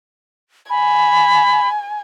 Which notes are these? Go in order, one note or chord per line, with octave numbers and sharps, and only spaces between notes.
G#5 B5